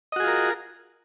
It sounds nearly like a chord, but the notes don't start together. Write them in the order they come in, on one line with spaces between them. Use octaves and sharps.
D#5 F#4 G#4 F4 A#4